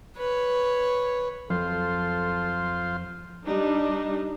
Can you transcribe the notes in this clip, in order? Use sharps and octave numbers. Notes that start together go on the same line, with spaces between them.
B4 C#5
F2 F#3 F4 A4 C5
G3 D4 D#4